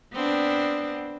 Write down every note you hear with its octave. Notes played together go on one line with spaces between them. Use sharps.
B3 C4 D4